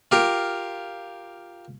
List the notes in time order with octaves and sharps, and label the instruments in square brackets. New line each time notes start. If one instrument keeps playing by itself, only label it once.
[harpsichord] F4 G4 A#4